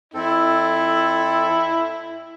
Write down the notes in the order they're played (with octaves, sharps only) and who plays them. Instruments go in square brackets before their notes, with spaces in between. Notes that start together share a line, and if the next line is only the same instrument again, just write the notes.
[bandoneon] F2 C4 A4 [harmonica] E4